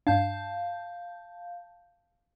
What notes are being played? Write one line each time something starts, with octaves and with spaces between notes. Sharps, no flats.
G2 D4 F5 A5 G6